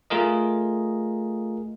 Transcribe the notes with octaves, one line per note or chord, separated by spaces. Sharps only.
A3 F4 G#4 A#4 D#5